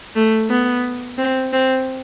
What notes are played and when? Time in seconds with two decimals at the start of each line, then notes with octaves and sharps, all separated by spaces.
0.16 A3
0.50 B3
1.18 C4
1.53 C4